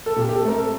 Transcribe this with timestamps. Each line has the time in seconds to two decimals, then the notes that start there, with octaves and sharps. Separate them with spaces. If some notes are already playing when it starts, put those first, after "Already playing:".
0.06 A4
0.16 A#2 G4
0.29 G4
0.35 A4
0.45 A3 C4 A#4
0.54 A4